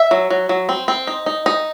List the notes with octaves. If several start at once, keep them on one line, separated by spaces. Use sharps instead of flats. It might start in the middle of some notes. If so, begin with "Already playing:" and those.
Already playing: E5
F#3
F#3
F#3
C4
C4
D#4
D#4
D#4